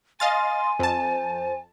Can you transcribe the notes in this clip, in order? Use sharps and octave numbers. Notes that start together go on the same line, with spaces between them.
D#5 F5 G#5 C6 A6
F2 C5 A5